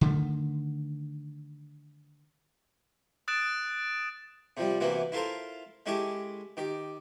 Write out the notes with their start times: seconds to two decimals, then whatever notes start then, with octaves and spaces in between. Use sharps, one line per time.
0.01 D3 D#3 A3
3.28 D#6 F#6 A6 D7 E7
4.57 C3 F3 G3
4.80 C3 E3 F#3 A#3 B3
5.12 E4 F4 A4 A#4 C5
5.86 G#3 C#4 E4 G4 A4
6.57 D#3 G4